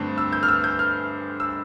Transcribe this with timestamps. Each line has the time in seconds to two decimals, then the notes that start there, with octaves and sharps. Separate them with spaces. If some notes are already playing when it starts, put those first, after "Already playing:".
Already playing: G2 D3 A3 C4
0.18 E6
0.33 G6
0.43 F6
0.48 E6
0.64 G6
0.79 F6
1.40 E6